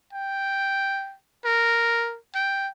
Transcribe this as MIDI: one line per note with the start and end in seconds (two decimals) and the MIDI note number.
0.13 1.15 79
1.45 2.17 70
2.35 2.68 79